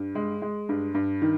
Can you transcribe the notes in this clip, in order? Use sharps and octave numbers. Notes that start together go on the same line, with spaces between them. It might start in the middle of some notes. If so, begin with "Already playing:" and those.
Already playing: G2
G#3
G#3
G2
G2
D#3